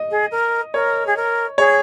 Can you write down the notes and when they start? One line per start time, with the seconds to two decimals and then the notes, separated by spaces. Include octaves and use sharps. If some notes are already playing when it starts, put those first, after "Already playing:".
Already playing: D#5
0.10 G#4
0.31 A#4
0.74 A#4 C#5
1.07 G#4
1.16 A#4
1.58 G#4 C#5